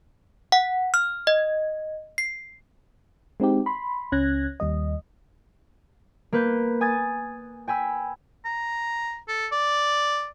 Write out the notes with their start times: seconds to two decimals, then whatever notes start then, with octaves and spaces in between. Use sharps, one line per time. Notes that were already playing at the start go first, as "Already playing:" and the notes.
0.52 F#5
0.94 F6
1.27 D#5
2.18 C7
3.40 G#3 C4 D#4 G4
3.66 B5 C6
4.12 C#2 C#4 F#6 G#6 A#6
4.60 D#2 G3 D#5
6.33 A#3 B4 G6
6.81 G#5 D#6 G#6 A6
7.68 G5 G#5 B5 E6
8.45 A#5
9.28 A4
9.52 D5